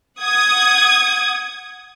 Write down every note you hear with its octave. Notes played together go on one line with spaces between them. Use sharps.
F#5 D#6 G#6